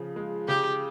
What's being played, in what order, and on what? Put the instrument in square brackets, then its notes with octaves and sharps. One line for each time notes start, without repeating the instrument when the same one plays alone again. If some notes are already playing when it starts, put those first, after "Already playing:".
Already playing: [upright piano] C#3 F3
G#3
[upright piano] C#3 [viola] G4